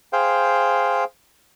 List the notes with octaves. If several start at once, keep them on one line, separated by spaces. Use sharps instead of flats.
G#4 C5 F5 G5